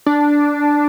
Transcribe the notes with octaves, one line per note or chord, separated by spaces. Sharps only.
D4